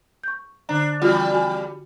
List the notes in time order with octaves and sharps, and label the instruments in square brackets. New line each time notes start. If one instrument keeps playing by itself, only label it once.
[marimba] C#6 G6
[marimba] D3 A#5 [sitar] D4
[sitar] E2 G3 [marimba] F4 F#4
[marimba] F#4 G#5